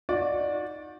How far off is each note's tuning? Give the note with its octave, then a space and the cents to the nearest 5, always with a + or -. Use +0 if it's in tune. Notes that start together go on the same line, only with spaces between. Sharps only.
D#4 +0 F#4 -35 D5 -5